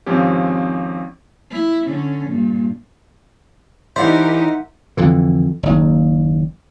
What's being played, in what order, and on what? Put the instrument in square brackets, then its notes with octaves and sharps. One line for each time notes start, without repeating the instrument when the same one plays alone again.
[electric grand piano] G#1 F3 C4 C#4 G4
[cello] E4
D3 C#4
G2 A#2
[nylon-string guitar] E3 D5 [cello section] D#4 G4 A#4 [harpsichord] C5 [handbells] E5 F#5
[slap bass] F2 D3 E3
F#1 D#2